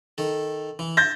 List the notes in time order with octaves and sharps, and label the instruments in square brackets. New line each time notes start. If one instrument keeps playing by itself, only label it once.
[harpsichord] D#3 A4
E3
[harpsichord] E5 [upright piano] G6 A6 A#6